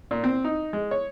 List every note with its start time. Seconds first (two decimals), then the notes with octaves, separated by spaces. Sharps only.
0.11 A#2
0.24 C4
0.44 D#4
0.73 G#3
0.91 C#5